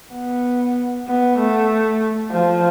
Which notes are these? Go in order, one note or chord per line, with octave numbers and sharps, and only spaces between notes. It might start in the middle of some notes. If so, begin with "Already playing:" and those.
B3
B3
A3
F3